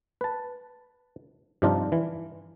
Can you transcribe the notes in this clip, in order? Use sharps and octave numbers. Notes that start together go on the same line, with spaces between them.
B4 A5
G2 C3 F3 D4 D#4 F4
E3